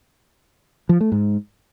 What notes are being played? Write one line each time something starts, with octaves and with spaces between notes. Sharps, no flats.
F3
A3
G#2